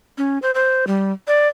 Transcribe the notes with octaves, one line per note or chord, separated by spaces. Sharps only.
C#4
C5
C5
G3
D5